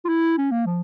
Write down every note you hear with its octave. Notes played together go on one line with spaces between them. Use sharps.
F4
E4
C#4
A#3
F3